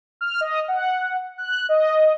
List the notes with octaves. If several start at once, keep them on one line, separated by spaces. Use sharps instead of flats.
F6
D#5
F#5
F#6
D#5